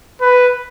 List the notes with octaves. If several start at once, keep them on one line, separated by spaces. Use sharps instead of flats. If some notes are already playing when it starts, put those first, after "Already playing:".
B4